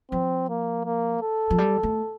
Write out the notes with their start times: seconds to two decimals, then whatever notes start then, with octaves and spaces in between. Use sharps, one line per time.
0.12 F3 C4
0.49 A#3
0.85 A#3
1.22 A4
1.50 F3
1.58 G3
1.83 A3